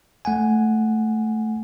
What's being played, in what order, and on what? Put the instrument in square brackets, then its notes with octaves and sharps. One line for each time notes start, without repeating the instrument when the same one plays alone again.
[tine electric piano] A3 F#5 G#5